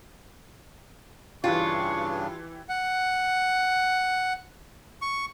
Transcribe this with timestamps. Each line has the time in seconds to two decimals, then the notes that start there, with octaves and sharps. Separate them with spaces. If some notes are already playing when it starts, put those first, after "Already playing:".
1.44 G2 C#3 E3 D4 E4 F4 G4 C#6
2.69 F#5
5.02 C#6